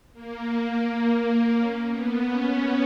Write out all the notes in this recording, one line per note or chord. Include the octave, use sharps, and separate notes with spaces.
A#3
C#4
B3
C#4